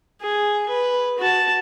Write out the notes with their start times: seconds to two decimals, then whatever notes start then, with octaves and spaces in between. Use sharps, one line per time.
0.21 G#4
0.70 B4
1.19 F#4 A5